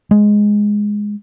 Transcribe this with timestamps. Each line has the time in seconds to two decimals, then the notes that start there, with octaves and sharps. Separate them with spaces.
0.11 G#3